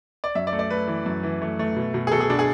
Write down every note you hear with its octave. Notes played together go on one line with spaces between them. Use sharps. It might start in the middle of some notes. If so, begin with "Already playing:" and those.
D5
F#2 E5
D5
A3
D5
A3 B4
E3
F#2
E3
A3
A3
B2
B2
G#4
B2 A4
G#4
B2 D4
G#4